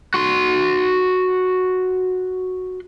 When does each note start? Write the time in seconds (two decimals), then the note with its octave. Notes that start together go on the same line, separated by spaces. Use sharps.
0.14 F#4 C6